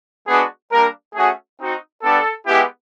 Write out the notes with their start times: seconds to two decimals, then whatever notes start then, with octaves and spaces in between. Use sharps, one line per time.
0.27 G#3 B3 D4 F#4 G#4
0.71 G3 A#3 D4 A#4
1.14 A3 C#4 F#4 G#4
1.59 C4 D#4 F#4
2.03 G3 B3 D4 A4
2.47 G#3 B3 E4 G4